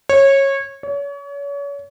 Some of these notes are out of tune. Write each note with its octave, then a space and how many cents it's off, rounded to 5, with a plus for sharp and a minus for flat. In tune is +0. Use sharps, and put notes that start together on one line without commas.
C#5 -20
C#5 +35